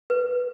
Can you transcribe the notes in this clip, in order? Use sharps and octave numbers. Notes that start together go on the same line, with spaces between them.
B4